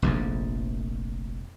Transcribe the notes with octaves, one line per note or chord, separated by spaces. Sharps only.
F1 A#1 F2